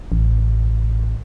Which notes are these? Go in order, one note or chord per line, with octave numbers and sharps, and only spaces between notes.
A1